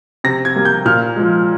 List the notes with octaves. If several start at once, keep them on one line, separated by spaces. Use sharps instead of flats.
C3 A#6
G#6
G3 A#3
G6
A#2 F6
F3 G#3